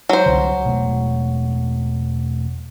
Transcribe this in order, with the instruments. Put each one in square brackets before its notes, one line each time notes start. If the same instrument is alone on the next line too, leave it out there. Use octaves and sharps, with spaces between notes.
[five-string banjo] F#3 C5
[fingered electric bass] C2 D3
E1 B2 A3